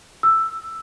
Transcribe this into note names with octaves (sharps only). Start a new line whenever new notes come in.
E6